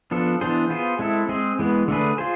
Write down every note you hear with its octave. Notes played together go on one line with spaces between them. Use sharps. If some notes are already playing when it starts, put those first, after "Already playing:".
F3 B3 D4 A4
E3 B3 D4 G#4 C5
B3 F4 G#4 C5
G#3 C4 E4 A4
G#3 C4 G#4
E3 G#3 B3
D3 A3 D4 G#4 B4
F4 G#4 C5